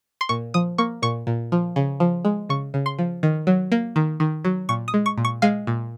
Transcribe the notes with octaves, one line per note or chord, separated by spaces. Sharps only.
C6
A#2 C#6
F3 D#6
A#3 C#6
A#2 C#6
A#2
F3
C#3
F3
G#3
C#3 C#6
C#3
C6
F3
D#3
F#3
A#3
D#3
D#3
F#3
A#2 C#6
D#6
G#3
C#6
A#2
C#6
G#3 F5
A#2